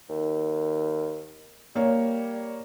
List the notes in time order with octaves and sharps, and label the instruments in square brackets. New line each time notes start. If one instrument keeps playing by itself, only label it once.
[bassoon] D#2
[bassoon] G3 [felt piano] A#3 C#5